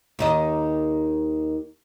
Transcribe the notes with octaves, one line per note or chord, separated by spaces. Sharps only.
D#2 D#3 D#5